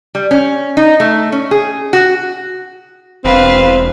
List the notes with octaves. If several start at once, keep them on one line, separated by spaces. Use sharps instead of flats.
G3
C#4
D#4
A3
C#4
G#4
F#4
E1 C4 B4 F5